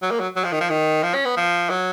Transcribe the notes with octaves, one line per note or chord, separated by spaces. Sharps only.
F#3
A#3
F#3
F#3
F3
D#3
F3
D#3
F3
C#4
B3
F3
F#3